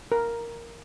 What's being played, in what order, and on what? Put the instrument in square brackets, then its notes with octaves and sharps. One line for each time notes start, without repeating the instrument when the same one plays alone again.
[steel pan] A#4